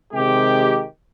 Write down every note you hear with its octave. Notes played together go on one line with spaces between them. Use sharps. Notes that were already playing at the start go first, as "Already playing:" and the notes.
C3 D#3 G#3 G4